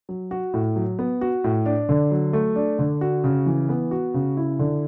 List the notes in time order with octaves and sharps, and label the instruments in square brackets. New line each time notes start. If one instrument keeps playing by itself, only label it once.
[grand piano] F#3
F#4
A2
F#3
B3
F#4
A2
D4
D3
F#3
A3
D4
D3
F#4
C#3
E3
B3
F#4
C#3
E4
D3